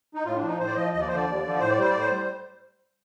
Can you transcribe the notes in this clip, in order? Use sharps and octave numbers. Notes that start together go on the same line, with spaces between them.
D#4
A2 F4
D4
F3
D#4
A2 C5
D5
F3 D#5
D#2 D#5
D5
F3 C5
D3 D5
D#2
D3 F3
A2 C5
D5
G3 C5
A2 D5
C5
G3